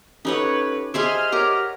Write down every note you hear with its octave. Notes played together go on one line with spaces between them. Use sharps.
C#4 D#4 G4 A4 B4 C#5 F#5
G4 G#4 C5 D#5 E5 G#5 F6
G4 A#4 C#5 F#5 A#5